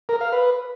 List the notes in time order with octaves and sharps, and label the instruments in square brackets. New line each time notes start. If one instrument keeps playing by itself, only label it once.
[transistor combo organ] A#4
F5
B4